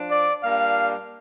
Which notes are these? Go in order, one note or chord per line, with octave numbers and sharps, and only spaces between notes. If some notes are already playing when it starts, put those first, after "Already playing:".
Already playing: F3 D4
D5
A#2 G3 A#3 D4 F5